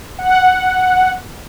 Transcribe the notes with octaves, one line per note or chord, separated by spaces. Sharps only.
F#5